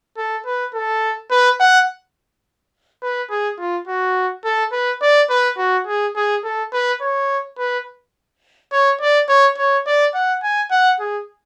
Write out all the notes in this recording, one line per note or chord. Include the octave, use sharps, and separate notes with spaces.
A4
B4
A4
B4
F#5
B4
G#4
F4
F#4
A4
B4
D5
B4
F#4
G#4
G#4
A4
B4
C#5
B4
C#5
D5
C#5
C#5
D5
F#5
G#5
F#5
G#4